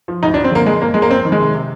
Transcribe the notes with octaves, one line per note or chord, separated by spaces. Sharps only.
F3
D2 D#4
D4
F3
C4
D3 A#3
F2 G#3
F2 A#3
F2 G#3
A#3
F2 C4
D#3
G#3
C3
C3